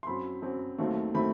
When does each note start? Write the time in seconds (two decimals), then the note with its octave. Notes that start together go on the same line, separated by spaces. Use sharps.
0.03 C6
0.07 F#2 F#3 C4 B5
0.42 F#2 F#3 C4
0.78 D#2 D#3 F#3 A3 C4
1.14 D#3 F#3 A3 C4 B5